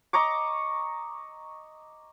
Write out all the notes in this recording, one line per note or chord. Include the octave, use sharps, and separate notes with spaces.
D#5 A#5 C#6 D6